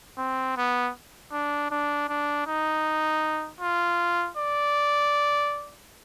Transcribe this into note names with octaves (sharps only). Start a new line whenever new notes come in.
C4
B3
D4
D4
D4
D#4
F4
D5